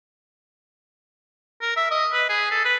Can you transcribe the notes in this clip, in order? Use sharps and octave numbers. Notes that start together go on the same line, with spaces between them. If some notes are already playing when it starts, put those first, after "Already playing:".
A#4
E5
D#5
B4
G#4
A4
B4